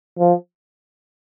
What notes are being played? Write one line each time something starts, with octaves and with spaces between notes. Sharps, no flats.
F3